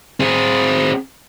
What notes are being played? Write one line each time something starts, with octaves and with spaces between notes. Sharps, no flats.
C4 G#4